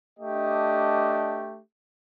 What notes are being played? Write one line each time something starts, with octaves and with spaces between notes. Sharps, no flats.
A3 D4 G4 D#5